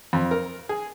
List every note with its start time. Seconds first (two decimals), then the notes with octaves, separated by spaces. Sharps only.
0.13 F2
0.31 A#4
0.69 G#4